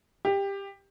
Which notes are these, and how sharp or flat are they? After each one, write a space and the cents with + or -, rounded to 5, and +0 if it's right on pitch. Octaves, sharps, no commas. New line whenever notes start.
G4 +15